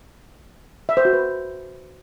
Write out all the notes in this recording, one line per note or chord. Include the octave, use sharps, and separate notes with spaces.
E5
C5
F#4
B4